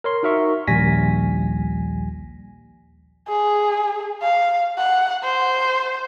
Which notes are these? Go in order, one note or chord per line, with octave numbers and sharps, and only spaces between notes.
A#4 C#5 C6
D#4 F#4 A#4 E5 C#6
A#1 D#2 G3 G#5 A#6 B6
G#4
F5
F#5
C5